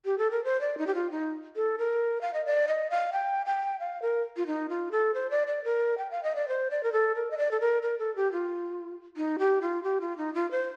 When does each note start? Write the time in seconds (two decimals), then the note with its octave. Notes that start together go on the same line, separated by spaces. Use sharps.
0.05 G4
0.18 A4
0.31 A#4
0.44 C5
0.61 D5
0.78 D#4
0.87 G4
0.95 F4
1.11 D#4
1.56 A4
1.78 A#4
2.21 F5
2.34 D#5
2.45 D5
2.68 D#5
2.90 F5
3.13 G5
3.46 G5
3.80 F5
4.02 A#4
4.37 F4
4.47 D#4
4.69 F4
4.91 A4
5.14 C5
5.31 D5
5.47 D5
5.64 A#4
5.98 G5
6.11 F5
6.23 D#5
6.36 D5
6.48 C5
6.71 D5
6.83 A#4
6.93 A4
7.15 A#4
7.31 D#5
7.38 D5
7.51 A4
7.60 A#4
7.82 A#4
7.99 A4
8.16 G4
8.32 F4
9.17 D#4
9.39 G4
9.62 F4
9.83 G4
10.01 F4
10.17 D#4
10.34 F4
10.51 C5